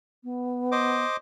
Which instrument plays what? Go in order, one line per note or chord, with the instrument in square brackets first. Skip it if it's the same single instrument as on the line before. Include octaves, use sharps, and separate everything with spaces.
[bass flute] B3
[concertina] C5 D#5 D6